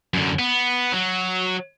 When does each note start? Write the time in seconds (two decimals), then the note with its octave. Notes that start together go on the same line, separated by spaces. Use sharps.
0.14 F#2 D3
0.39 B3
0.92 F#3